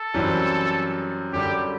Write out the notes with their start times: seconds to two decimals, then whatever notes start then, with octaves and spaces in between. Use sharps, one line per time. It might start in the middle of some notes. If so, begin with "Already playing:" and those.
Already playing: A4
0.14 F#2 E3 G3 C4
1.33 F#2 D3 G3 G4